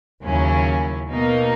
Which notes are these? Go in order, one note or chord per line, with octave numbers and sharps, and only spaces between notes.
D#2 C#3 F#3 C#4 E4
B2 A#3 D#4 A#4